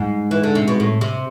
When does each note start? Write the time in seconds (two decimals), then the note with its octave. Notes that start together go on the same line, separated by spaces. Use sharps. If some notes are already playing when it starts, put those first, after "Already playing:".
Already playing: G#2
0.31 E3
0.43 D3
0.55 C3
0.68 B2
0.80 A2
1.01 C3